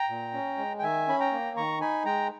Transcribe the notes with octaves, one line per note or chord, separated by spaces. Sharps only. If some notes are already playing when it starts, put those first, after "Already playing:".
Already playing: G5 A#5
A#2
C#4
G#3
G5
D#3 E5 G#5
C#4 B5
G5 A#5
A#3
D#3 A#5 C#6
D#4 G#5 B5
G#3 G5 A#5